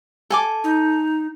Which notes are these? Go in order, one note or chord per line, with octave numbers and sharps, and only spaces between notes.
A4 G#5 D6
D#4